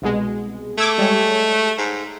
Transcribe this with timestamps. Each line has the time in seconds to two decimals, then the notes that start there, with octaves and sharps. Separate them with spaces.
0.02 C2 B2 G#3
0.78 A3 D6 E6 G#6
0.98 G3 G#3 C#5
1.78 G#2